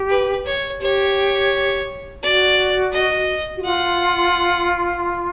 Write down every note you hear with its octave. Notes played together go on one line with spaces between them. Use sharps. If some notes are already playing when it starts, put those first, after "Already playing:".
Already playing: G4
B4
C#5
G4 C#5
F#4 D5
D#5
F#4
F4 F#5